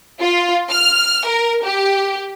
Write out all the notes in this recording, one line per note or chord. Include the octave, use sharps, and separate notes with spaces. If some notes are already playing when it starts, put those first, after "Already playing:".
F4
F6
A#4
G4